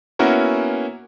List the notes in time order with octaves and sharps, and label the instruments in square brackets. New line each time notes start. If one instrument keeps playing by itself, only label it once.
[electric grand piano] A#3 B3 C#4 E4 F#4 A#4